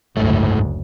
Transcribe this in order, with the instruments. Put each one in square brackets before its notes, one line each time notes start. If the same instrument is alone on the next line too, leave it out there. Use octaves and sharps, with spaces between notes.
[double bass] F#1 D2 [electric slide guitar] G#2 A3